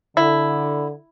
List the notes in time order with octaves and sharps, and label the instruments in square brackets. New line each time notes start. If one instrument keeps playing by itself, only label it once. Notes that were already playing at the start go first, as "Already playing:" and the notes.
[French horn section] D3 [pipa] E4